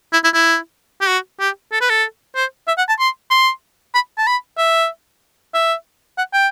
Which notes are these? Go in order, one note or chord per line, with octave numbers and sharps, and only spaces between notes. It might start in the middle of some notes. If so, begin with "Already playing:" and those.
E4
E4
E4
G4
F#4
G4
A4
B4
A4
C5
E5
F#5
A5
C6
C6
B5
A5
B5
E5
E5
F#5
G5